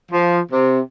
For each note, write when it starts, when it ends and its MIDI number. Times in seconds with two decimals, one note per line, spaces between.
0.12 0.40 53
0.51 0.80 48